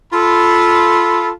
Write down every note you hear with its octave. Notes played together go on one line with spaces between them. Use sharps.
F4 A4 B5